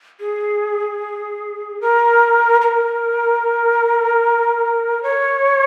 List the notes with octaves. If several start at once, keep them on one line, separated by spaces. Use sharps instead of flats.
G#4
A#4
A#4
C#5